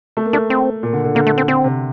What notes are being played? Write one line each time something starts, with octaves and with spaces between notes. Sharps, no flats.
A3
A#3
A3 D4
C4
A#2
D3
D3
D3 A#3
A3
C4
D3 C4
C3